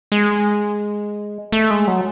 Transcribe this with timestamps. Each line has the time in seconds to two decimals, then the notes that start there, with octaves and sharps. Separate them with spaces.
0.12 G#3
1.52 A3
1.71 G#3
1.87 F#3